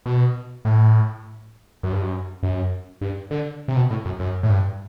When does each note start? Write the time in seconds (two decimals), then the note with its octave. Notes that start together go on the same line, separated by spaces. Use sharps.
0.06 B2
0.65 A2
1.83 F#2
1.92 G2
2.02 F#2
2.43 F#2
3.01 G2
3.31 D3
3.68 C3
3.76 B2
3.91 A2
4.05 F#2
4.20 F#2
4.43 A2
4.50 G2